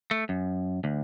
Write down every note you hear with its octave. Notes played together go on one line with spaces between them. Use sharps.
A3
F#2
D2